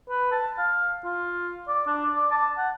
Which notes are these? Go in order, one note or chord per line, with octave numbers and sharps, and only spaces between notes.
B4
A5
F5
F4
D5
D4
D5
A5
F#5